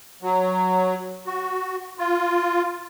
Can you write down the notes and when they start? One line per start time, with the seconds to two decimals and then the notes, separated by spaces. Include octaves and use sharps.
0.22 F#3
1.26 F#4
1.99 F4